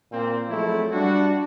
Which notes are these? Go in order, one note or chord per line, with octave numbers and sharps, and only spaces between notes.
A#2 A#3 C4
F3 F#3 G#3 A3 C4 E4
G3 D4 F#4